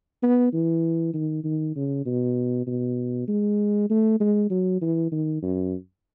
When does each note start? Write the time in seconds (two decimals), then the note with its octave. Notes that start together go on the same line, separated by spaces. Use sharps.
0.23 B3
0.53 E3
1.14 D#3
1.44 D#3
1.76 C#3
2.06 B2
2.67 B2
3.28 G#3
3.90 A3
4.20 G#3
4.50 F#3
4.82 E3
5.12 D#3
5.42 F#2